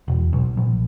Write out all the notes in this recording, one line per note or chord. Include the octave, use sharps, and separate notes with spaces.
E1
B1
A#1